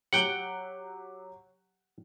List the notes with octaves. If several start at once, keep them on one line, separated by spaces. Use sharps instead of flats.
F#3 G4 F#5 G5 F#6